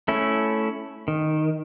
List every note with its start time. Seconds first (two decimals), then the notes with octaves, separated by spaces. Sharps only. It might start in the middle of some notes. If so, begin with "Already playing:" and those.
0.08 A3 C#4 E4
1.08 D#3